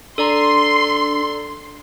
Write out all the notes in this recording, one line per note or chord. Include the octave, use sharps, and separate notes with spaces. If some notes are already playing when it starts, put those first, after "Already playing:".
D4 A4 D5 A#5 C6